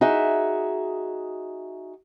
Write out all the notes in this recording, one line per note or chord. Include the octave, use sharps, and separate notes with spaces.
D#4 F#4 G#4 E5